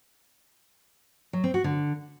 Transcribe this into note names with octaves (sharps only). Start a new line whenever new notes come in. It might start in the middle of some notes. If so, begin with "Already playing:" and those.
F#3
C4
F#4
D3